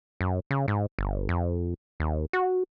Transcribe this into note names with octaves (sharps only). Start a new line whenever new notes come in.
F#2
C#3
G#2
G1
F2
D#2
F#4